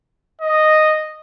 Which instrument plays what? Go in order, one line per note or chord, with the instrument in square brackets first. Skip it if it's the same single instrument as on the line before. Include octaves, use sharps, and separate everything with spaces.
[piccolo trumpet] D#5